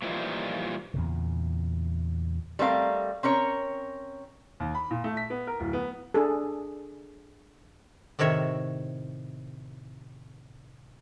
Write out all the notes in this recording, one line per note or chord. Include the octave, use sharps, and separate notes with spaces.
A#2 E3 F3 G3 D#4
E2 A#2 C#3
G3 A3 C4 A#4 C5 F5
C4 C#4 A#4 C#5
D#2
B5
A#2
A3
B6
B3
A#4
D1
B3
D4 G#4 A4
A2 C3 D#3 C#5 E5